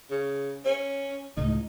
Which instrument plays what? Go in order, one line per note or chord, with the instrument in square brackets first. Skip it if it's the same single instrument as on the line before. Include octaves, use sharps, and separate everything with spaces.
[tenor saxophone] C#3
C#4
[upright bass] C#2 A2 [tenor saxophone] D#4